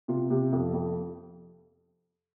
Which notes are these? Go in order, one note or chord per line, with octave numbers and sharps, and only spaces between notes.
C3 F4
C3 G4
F2
F2